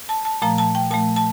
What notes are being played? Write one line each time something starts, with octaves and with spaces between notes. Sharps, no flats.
A5
A5
A#2 F3 A3 A#5
A5
G5
A#2 F3 A3 A5
A5